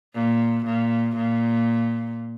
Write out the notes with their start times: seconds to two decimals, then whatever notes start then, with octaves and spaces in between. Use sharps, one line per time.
0.14 A#2
0.65 A#2
1.15 A#2